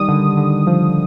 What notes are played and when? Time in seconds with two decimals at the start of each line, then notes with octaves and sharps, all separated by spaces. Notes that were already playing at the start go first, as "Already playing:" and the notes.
Already playing: D#3 G3 D#6
0.09 D3
0.37 D3
0.67 F3